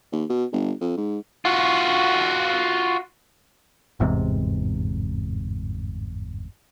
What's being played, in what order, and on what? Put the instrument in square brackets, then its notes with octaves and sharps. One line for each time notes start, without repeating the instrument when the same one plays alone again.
[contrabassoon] D#2
B2
G1
F2
G#2
[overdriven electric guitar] F4 F#4
[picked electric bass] G1 E2 G#2 C3